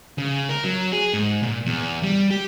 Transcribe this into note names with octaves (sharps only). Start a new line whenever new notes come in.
C#3
A#4
F#3
G#4
G#2
A#2
E2
G3
G4